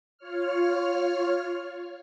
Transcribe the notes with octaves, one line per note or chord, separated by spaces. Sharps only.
F4 C#5 F6